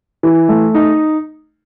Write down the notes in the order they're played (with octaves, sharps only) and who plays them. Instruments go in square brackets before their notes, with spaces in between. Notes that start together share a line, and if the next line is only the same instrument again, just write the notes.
[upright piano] E3
A3
D#4